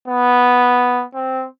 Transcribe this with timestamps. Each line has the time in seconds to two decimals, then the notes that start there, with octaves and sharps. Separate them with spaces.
0.08 B3
1.15 C4